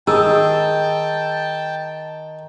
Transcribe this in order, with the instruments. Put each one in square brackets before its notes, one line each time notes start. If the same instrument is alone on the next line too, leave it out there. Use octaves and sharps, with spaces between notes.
[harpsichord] D#3 [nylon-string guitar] G#4 [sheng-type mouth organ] G5 A5 [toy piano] D#6 E6